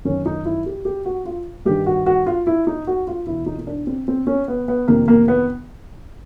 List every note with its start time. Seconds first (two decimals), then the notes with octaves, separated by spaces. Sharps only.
0.05 F#2 D#3 C#4
0.26 D#4
0.45 E4
0.66 G4
0.85 G4
1.05 F#4
1.25 F4
1.65 G2 D#3 G4
1.86 F#4
2.06 F#4
2.26 F4
2.47 E4
2.67 D#4
2.87 F#4
3.07 F4
3.27 E2 B2 E4
3.46 D#4
3.59 D#4
3.67 D4
3.87 C4
4.08 C4
4.27 C#4
4.48 B3
4.68 B3
4.88 F2 C3 D#3 A#3
5.08 A#3
5.28 B3